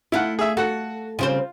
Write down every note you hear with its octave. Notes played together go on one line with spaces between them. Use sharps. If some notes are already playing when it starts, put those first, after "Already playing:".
A3 E4 F4 F#5
G#4 E5
F#4 A4 F#5
C#3 C4 F4 C5